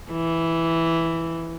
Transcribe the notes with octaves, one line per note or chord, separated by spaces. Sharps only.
E3